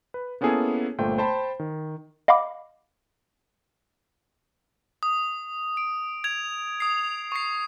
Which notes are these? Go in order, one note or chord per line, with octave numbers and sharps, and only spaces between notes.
B4
A#3 B3 C#4 E4 G#4 A4
G1 A#2 A3 C5 G5
C5 G5 A5 B5
D#3
D#5 F5 F#5 B5 D6
D#6
D7
G#6 F7
D#6 C7
C#6 C7